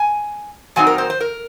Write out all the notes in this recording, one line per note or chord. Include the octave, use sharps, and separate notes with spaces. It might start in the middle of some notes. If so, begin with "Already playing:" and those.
Already playing: G#5
A#2 F#3 C4 D#4 G#5
A#4
C5
C5
A#4